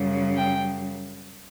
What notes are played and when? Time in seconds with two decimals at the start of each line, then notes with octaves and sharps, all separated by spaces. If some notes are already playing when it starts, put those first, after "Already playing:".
Already playing: F#2 C#3 G3
0.36 G5